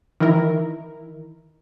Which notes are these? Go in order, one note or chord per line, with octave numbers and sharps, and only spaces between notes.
D#3 E3 E4 A#4